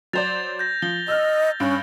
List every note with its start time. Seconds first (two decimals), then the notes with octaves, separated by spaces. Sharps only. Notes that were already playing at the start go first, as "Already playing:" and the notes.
0.13 F#3 C5 D5 A6 F7
0.59 G6 A#6
0.82 F3 G7
1.08 D#5 E6 F6
1.60 G2 C#4